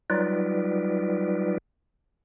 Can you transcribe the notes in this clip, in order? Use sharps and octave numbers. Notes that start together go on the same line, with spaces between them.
F#3 G3 D#4 F4 B4 D5